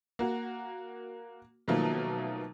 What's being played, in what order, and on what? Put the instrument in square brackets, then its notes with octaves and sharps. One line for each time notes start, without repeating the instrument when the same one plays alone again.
[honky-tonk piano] A#3 F#4
B2 D#3 F3 F#3 A3 A#3